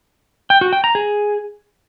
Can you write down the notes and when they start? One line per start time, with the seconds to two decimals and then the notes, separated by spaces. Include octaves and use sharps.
0.50 G5
0.61 F#4
0.73 G5
0.84 A#5
0.95 G#4